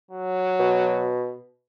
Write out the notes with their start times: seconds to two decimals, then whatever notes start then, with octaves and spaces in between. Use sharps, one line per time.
0.11 F#3
0.59 B2